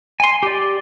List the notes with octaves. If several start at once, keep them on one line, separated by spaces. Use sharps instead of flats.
G#5 C6
G4 D5